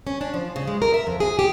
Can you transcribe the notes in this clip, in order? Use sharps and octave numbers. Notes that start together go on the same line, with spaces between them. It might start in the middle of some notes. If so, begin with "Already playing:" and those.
C#4
D4
F3
C#3
G#3
A#4
E5
F2
G#4
G4